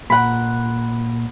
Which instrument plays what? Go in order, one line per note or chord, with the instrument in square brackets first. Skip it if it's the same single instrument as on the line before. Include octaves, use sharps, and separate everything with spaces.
[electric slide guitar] A#2 [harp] F#5 B5